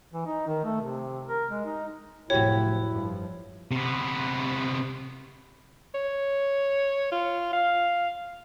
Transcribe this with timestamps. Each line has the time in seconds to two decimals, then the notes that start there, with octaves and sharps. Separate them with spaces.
0.14 E3
0.26 D#4
0.47 D#3
0.64 A3
0.81 C3
1.27 A#4
1.51 G#3
1.65 D#4
2.30 F1 A2 F3 F#3 E4 F#4 G4 C#5
2.90 G2 F3
3.71 C3 B3
5.95 C#5
7.12 F4
7.53 F5